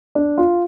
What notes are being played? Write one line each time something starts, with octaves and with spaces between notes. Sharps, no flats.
D4
F4